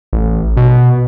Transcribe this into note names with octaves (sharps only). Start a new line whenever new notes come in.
A1
B2